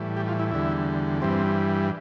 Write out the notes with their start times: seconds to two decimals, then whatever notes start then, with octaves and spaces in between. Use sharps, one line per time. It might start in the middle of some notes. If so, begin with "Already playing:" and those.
Already playing: A2 E3 G3
0.17 G4
0.28 F4
0.39 E4
0.51 E2 D3 G3 E4
1.22 G2 E3 G3 C4